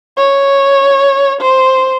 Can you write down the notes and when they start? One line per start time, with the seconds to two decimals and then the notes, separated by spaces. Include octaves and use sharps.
0.17 C#5
1.41 C5